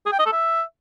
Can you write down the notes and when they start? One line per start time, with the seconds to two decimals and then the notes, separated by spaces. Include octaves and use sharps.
0.06 G#4
0.12 G5
0.19 D#5
0.26 A4
0.33 E5